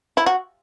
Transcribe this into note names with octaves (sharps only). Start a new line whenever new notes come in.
E4
F#4